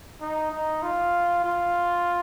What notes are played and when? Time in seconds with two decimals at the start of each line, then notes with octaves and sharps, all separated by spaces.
0.21 D#4
0.52 D#4
0.83 F4
1.44 F4